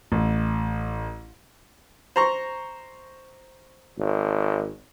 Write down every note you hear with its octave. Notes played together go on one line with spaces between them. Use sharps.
A1
C5 A#5 C#6
G#1